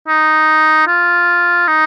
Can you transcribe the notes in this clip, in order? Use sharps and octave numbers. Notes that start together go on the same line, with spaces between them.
D#4
F4
D#4